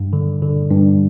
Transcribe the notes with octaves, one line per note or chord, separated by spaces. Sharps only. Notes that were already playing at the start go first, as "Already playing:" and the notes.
Already playing: G2
D3
D3
G2